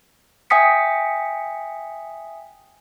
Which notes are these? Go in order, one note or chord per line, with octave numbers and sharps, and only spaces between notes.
E5 G5 G#5 D#6 B6 C#7